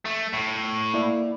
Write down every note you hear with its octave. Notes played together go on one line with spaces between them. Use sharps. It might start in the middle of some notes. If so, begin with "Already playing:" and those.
A3
A2
A#3 E4 D5